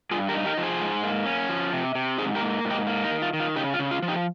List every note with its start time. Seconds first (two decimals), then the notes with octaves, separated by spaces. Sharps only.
0.11 G2 F4 G#4
0.29 G4 A#4
0.34 D#4
0.46 G4 A#4
0.57 F3
0.63 G#4 C5
0.81 G#2
1.04 A#3
1.26 C#4
1.49 F3
1.73 C3
1.95 C3
2.18 G#2 G#4 C5
2.35 G4 A#4
2.41 A#3
2.65 G#2
2.70 D#4 G4
2.87 A#3
3.04 D#4
3.10 D#3
3.22 F4
3.33 D#3
3.40 F4
3.56 C#3 D#4 G4
3.74 F4
3.79 C#3
3.91 F4
4.02 F3
4.08 D#4 G4